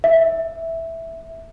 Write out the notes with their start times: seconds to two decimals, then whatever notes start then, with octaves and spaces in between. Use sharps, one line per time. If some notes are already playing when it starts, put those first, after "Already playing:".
0.04 E5